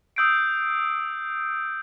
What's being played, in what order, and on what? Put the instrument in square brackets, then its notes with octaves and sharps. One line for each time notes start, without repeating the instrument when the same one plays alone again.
[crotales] D#6 E6 G6 C7 D7